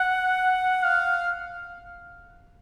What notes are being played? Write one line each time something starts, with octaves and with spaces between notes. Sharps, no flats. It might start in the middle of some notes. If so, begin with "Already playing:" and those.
Already playing: F#5
F5